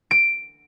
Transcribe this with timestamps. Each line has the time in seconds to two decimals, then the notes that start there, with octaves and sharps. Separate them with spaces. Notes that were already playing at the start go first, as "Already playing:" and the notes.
0.11 D7